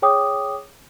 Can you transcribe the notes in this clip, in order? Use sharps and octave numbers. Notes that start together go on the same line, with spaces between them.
G#4 C#5 G5 D6 D#6